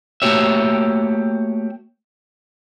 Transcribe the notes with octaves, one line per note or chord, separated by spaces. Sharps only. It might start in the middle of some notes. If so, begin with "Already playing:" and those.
A3 A#3 F#4 G4 C#5 E5